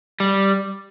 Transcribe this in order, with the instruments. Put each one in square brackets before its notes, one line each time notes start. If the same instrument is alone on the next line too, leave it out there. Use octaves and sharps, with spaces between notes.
[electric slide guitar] G3